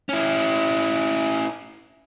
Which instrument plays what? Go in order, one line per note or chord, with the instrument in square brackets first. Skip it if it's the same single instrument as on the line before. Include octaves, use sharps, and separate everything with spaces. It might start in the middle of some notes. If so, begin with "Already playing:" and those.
[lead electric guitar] C#4 E4